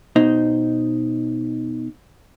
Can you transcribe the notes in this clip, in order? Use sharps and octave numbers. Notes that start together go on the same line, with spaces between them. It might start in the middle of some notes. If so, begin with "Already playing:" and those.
B2 D#4 C5